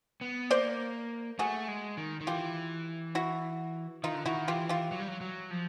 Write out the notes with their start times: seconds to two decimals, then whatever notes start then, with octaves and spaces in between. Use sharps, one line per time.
0.21 B3
0.50 A#3 C5 D5
1.39 A3 F#4 G#4
1.68 G#3
1.97 D#3
2.21 D#3
2.27 E3 F4 G4
3.15 E4 F#4
4.04 D#3 D#4 F4
4.15 D3
4.26 D#3 E4 F#4
4.48 E3 F4 G4
4.69 F4 G4
4.92 F#3
5.00 G3
5.08 F#3
5.21 F#3
5.51 F3